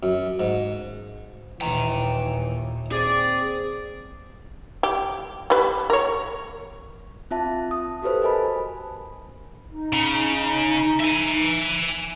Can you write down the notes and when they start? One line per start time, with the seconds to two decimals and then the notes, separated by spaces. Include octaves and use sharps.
0.03 F#2
0.40 G#2
1.61 D#2 A#2 E3 G5 A#5
2.92 C4 G#4 D5
4.83 G4
5.50 G3 B4
5.90 A#4 C#5
7.31 C4 F4 E5 A5
7.71 D#6
8.03 F#4 G4 A4 B4 C5
8.22 A#4 D#5 G#5 A5 B5
9.69 D#4
9.93 C#3
11.00 E5 G#5